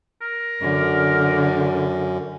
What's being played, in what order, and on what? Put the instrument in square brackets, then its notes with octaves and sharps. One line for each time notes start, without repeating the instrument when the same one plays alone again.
[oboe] A#4
[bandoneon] F#2 [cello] D3